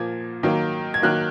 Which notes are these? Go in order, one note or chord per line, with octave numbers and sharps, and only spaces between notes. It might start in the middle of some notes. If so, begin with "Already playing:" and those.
Already playing: A#2 F3 A#3 G#6
D#3 F#3 A#3
G#6
D#3 F#3 A#3 F#6